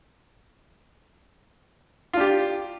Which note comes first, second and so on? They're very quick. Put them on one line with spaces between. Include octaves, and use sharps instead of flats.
F4 D4 G4